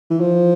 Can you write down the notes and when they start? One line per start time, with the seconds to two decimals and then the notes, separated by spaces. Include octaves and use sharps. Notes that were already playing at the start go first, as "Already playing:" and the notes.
0.10 E3
0.20 F3